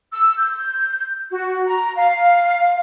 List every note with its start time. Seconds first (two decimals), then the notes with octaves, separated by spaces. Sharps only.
0.12 E6
0.38 G6
1.31 F#4
1.66 A#5
1.95 F5